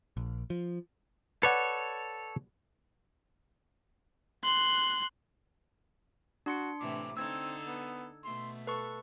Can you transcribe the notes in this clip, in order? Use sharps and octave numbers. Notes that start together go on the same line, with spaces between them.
A#1
F3
A4 B4 C#5 D5 F#5
C6 F#6
D4 F#4 C6 C#7
A2 C3 E3 D6
D3 C4 D#4 A4 E6 G#6
B3
B2 A3 C6
A4 B4 C#6